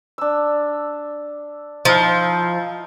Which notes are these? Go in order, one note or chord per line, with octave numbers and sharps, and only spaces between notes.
D4 E6
F3 D#4 E4 F5